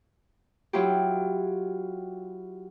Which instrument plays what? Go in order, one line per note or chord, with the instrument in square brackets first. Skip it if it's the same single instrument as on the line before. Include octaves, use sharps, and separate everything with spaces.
[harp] F#3 E4 F4 G4